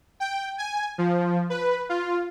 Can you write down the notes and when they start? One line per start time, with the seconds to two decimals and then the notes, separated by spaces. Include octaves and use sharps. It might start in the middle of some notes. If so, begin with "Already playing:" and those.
0.20 G5
0.58 G#5
0.98 F3
1.50 B4
1.89 F4